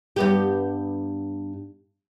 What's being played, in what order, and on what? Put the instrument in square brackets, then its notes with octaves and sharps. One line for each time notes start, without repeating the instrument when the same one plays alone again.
[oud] G2 B3 G4